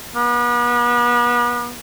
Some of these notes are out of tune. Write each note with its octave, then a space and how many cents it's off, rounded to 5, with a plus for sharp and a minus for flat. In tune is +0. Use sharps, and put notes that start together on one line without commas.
B3 -40